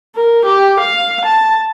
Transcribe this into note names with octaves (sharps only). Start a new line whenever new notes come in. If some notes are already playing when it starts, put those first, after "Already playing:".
A#4
G4
F5
A5